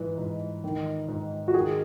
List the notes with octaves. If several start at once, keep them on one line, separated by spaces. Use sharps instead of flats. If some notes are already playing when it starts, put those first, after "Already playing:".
Already playing: G#2 E3
G#2
D#3
G#2
F#4
D#3 G#4